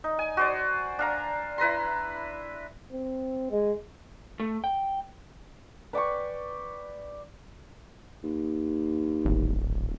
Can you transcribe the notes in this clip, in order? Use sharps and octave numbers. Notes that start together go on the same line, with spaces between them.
D#4
G#5
F#4 C5 D5
D4 F5 A#5
E4 B4 A#5 C6
C4
G#3
A3
G5
B4 D5 G5 C#6
D#2
D1 G#1